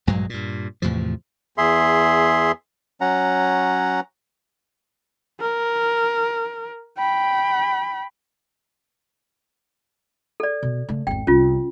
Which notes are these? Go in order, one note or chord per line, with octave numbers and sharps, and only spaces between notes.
A#1 G2 F#3 G#3
G2 A#2
E2 A2 C3 F3
E2 G#4 E5 C6
F#3 C#4 F#5 A#5
A#4
G5 B5
A4 D5
B2
C#3 A3
G#1 E2 G5
C2 C#4 F4